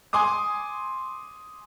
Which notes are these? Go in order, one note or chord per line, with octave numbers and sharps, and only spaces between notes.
G#5 C6 D6 D#6